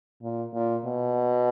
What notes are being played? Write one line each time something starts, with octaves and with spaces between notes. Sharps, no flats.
A#2
A#2
B2